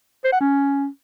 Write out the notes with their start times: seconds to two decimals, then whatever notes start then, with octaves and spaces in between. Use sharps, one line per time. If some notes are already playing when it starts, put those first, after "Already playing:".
0.25 C5
0.33 F#5
0.41 C#4